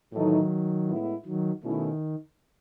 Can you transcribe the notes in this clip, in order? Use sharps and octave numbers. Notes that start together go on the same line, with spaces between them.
A2 D#3 E3 F#3 A3 D#4
A2 G#3 B3 E4
D#3 F#3
B2 D#3 A3 C#4 E4